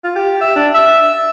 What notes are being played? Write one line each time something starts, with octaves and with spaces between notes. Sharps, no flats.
F4
G4
E5
D4
E5
E5